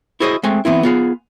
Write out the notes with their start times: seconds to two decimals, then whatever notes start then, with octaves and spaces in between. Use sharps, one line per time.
0.20 E4 F#4 G#4 C5 D5 D#5
0.43 G#3 A3 C4 G#5
0.65 E3 B3 C4 E4
0.83 B3 F4 G#4